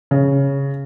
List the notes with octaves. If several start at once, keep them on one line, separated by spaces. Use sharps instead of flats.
C#3